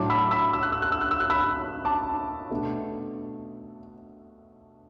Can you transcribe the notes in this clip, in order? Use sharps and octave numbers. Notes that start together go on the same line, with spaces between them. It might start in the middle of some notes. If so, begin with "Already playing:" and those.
Already playing: A2 F#3 D4 A5 D6
B5 E6
B5 E6
E6
F#6
E6
F#6
E6
F#6
E6
F#6
B5 E6
A5 D6
B2 A3 D4